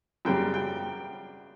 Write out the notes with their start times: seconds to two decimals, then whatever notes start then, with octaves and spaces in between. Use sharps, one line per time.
0.25 F#2 C#3 G3 G5
0.54 G5